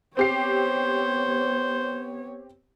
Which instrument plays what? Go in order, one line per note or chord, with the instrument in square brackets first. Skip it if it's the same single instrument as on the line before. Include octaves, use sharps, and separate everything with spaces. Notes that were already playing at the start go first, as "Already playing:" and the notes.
[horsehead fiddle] B3 C#5 [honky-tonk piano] C4 G4 C7 [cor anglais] C5